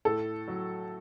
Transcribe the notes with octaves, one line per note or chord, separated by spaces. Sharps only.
A2 A4
F#3